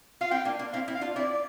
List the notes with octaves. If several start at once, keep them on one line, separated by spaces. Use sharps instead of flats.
F4 F5
C4 E4 G5
A#3 D4
A#3 D4
C4 E4 F5
C4 E4
F5
D4 F4
C4 E4 D5